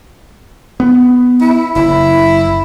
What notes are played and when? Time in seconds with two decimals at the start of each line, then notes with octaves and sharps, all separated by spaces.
0.80 B3
1.41 E4
1.76 F#1 E4